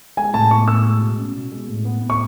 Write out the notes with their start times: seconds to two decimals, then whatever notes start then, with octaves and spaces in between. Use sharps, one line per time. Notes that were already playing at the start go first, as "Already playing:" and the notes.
0.17 G#3 G#5
0.34 A2 A5
0.50 B3 C#6
0.68 A2 E6
0.85 G#3
1.01 B2
1.18 C#4
1.35 B2
1.52 G#3
1.68 A2
1.85 B3
2.02 A2
2.10 C#6